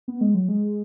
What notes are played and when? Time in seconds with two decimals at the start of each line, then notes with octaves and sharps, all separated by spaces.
0.08 B3
0.21 G#3
0.34 F#3
0.48 G#3